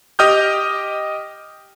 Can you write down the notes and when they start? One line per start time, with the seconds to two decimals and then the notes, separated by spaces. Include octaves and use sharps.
0.19 G4 D#5 G5 D#6 F6 G6